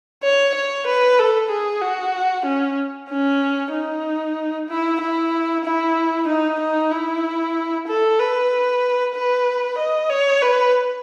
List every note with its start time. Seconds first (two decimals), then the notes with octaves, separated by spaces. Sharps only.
0.23 C#5
0.55 C#5
0.87 B4
1.19 A4
1.50 G#4
1.82 F#4
2.45 C#4
3.10 C#4
3.73 D#4
4.69 E4
5.00 E4
5.65 E4
6.28 D#4
6.60 D#4
6.91 E4
7.87 A4
8.19 B4
9.15 B4
9.78 D#5
10.10 C#5
10.42 B4